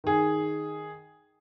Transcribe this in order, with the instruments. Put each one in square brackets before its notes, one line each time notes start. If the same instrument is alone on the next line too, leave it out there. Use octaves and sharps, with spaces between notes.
[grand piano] D#3 G#4